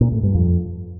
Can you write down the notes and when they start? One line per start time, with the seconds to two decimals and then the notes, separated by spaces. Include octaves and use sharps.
0.01 A#2
0.12 A2
0.23 G2
0.35 F2